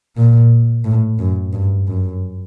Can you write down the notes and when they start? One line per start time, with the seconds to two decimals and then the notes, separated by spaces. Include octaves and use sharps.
0.16 A#2
0.84 A2
1.19 F#2
1.53 G2
1.87 F#2